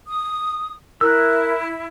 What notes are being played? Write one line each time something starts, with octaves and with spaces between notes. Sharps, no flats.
D#6
E4 A#4 E6 F#6